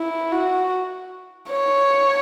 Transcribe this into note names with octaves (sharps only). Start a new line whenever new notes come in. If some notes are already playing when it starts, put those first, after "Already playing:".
Already playing: E4
F#4
C#5